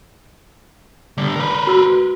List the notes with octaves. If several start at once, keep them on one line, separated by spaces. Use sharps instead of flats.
D3 G3
A#4 B4
F#4 E6